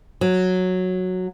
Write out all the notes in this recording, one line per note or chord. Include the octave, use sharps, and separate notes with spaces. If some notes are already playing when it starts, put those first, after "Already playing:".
F#3